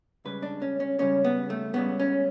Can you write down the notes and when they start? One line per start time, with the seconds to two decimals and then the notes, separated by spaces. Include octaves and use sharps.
0.25 C#2 C#3 G3 B4
0.43 D4
0.62 C#4
0.80 C#4
0.99 C#2 C#3 G3 C#4
1.24 B3
1.50 A3
1.74 C#2 C#3 G3 B3
1.99 C#4